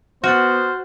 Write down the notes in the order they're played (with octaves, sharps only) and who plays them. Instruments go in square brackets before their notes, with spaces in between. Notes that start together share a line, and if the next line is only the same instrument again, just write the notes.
[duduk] B3 [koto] F#4 [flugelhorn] C5 [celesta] F6 F#6 A6